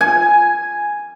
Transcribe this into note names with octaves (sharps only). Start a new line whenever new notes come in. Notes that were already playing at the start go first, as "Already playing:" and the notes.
G#5